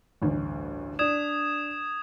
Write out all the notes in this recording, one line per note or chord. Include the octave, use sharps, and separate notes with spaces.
A1 D2 G2
D4 D5 D#6 G#6 E7